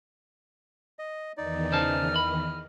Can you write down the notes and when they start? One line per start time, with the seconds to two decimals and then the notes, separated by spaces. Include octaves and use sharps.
0.99 D#5
1.37 E2 D#3 E3 D#4 D5
1.72 C#3 C5 D#5 A5 F6
2.16 B5